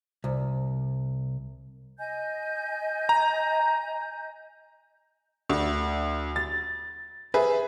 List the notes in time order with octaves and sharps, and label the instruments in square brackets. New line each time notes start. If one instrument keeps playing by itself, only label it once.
[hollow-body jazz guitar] C2
[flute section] D#5 G#5 G6
[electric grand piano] A#5
[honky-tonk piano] D2
A6
G#4 B4 E5